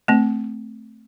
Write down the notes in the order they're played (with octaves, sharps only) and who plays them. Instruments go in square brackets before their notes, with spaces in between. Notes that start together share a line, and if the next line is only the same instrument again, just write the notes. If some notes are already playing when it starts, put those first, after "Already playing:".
[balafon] A3 C4